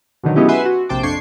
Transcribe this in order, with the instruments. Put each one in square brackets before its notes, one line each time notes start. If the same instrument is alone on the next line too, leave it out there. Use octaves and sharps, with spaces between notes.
[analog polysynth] B2 D3 D#3 F#3
F#3 G#3 B3 C#4 E4 G4
B4 E5 F#5 G#5 C6
F#4
A#1 C3 C5 G5 A5 D6
F2 D4 C#6 G#6 C7